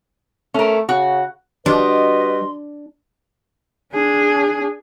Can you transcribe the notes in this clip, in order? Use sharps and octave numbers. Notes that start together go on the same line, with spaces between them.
A3 C#4 A#4
C#3 F#4
G3 D4 F#4 B4 D#5 C6
D4 G#4